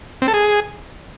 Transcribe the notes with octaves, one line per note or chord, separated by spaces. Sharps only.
C4
A4
G#4